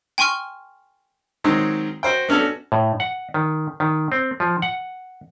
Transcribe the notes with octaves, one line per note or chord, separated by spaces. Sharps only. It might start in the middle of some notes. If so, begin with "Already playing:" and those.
G5 G#5 C6 C#6 F6
D#3 F#3 G#3 C4
F#4 C5 G5
B3 C#4 D4 F#4 A4
A2
F#5
D#3
D#3
C4
F3
F#5